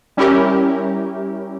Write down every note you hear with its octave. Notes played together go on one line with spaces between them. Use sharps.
G3 C#4 E4 G4 A#4